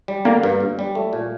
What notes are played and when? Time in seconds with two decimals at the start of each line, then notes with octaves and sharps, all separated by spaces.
0.08 G3
0.25 D3 A#3
0.43 G2
0.60 G1
0.79 G3
0.95 A3
1.13 A#2